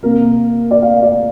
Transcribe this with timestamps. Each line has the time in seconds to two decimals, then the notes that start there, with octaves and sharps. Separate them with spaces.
0.03 C3 A#3 A#4
0.71 D5
0.82 F5
1.02 D5